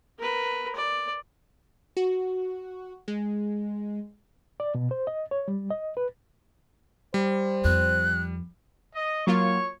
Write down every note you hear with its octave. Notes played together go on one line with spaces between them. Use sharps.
A#4 B4
D5
F#4
G#3
D5
B2
C5
D#5
C#5
G3
D#5
B4
G3 C5
F2 F#6
D#5
F#3 A#3 F4 C#5 C#6